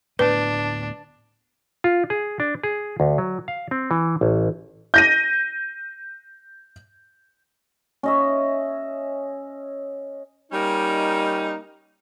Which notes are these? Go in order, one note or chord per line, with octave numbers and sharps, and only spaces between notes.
D1 A2 B3 D4 B4
F4
G#4
D4
G#4
D2
F#3
F5
C4
E3
A1
G6 A#6 D#7
C#4 D#5 E5
G3 A#3 C#4 D#4